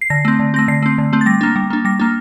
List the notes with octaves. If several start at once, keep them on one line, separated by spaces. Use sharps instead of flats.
C7
D3 A#6
A3 C4
D3
A3 C4 A#6
D3 C7
A3 C4
D3
A3 C4
A6
G3 A#6
A#3 D4
G3
A#3 D4
G3 A#6
A#3 D4